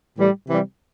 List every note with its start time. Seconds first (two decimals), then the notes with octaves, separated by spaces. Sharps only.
0.16 A2 E3 G3
0.48 C3 E3 G3